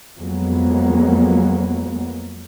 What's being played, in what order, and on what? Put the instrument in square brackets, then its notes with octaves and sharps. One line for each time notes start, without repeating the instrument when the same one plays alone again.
[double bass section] F2 F#3 G#3 A#3 B3